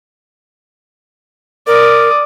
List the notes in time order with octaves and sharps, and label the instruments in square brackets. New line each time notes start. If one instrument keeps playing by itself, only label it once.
[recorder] A#4 [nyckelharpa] D5 D#6